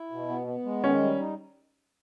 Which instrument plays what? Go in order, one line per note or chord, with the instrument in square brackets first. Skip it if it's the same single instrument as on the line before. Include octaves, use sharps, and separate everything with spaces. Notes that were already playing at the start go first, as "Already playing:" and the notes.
Already playing: [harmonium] E4
B2
B3
B3
G#3
[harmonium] D#3 [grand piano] C#4
[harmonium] G3
D#4